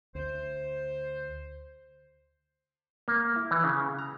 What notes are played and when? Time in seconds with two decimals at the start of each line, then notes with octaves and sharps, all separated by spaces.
0.15 D2 C5
3.08 A#3
3.36 E4
3.51 E3
3.64 C#3
3.99 A#5